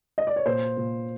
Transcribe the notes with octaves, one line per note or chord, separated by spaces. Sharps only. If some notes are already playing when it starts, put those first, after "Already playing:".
D#5
D5
C#5
A#2 C5
A#2